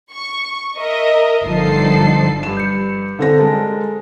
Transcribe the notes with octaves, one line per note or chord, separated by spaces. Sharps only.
C#6
A#4 D#5 E5
G1 D3 F3 D#4 A4 C7
G2 E7
G6 C#7
D3 C4 A4 A#6
G#3 A#4 A5